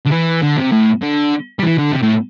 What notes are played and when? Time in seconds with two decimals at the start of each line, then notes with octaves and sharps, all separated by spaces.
0.06 D3
0.12 E3
0.43 D3
0.57 C3
0.72 A2
1.02 D3
1.59 G3
1.63 E3
1.78 D3
1.93 C3
2.03 A2